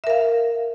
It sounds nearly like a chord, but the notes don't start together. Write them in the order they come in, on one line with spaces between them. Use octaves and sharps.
E5 A#4 F5